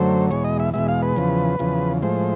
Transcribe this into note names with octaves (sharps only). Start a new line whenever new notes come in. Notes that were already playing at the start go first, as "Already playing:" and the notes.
Already playing: F#2 D3 F#3 A3 C5
E2 B2 G#3 C#5
D#5
E5
E2 B2 G#3 E5
F5
B4
E2 C#3 F3
E2 C#3 F3
A2 F3 G#3 C5